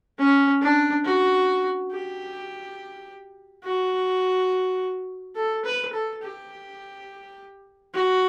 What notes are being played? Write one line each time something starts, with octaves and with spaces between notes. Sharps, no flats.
C#4
D4
F#4
G4
F#4
A4
B4
A4
G4
F#4